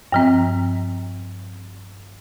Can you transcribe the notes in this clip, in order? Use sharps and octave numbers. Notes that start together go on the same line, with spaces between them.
G2 F3 C4